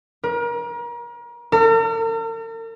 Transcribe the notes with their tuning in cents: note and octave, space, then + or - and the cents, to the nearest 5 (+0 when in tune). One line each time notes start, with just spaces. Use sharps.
A#4 +35
A#4 -45